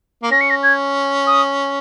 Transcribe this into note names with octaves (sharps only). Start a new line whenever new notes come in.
A#3
C#4 A#6
C#7
A#6
G#6
D#6